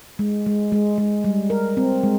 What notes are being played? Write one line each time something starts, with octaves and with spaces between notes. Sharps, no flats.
G#3
G#3
G#3
G#3
G3
A#4
C4
G#3